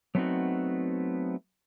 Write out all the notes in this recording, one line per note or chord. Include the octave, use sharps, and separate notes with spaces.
F#3 A3 B3 C4 D#4 F#4